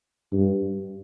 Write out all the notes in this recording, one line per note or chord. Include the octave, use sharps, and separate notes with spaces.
G2